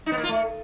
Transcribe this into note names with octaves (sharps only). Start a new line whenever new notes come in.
D#4
B3
A#3
F4
A3